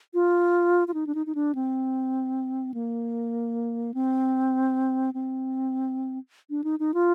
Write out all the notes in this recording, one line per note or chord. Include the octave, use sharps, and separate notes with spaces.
F4
F4
D#4
D4
D#4
D#4
D4
C4
A#3
C4
C4
D4
D#4
D#4
F4